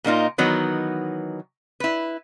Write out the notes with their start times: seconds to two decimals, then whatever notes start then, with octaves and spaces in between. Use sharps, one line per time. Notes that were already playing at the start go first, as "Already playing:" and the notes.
0.04 A#2 A#3 D#4 F4
0.38 D#3 E3 F#3 B3 D#4
1.80 E4 B4